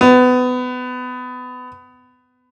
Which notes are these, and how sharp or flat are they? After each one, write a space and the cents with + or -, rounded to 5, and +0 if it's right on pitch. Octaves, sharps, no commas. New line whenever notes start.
B3 +25